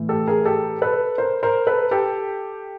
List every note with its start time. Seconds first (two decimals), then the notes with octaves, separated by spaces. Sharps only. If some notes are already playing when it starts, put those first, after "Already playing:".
Already playing: A2 E3
0.09 G4 A4
0.27 G#4 A#4
0.45 G4 A4
0.82 A4 B4
1.18 A#4 C5
1.43 A#4 C5
1.67 A4 B4
1.91 G4 A4